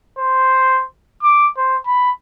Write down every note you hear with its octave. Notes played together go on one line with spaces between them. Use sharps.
C5
D6
C5
B5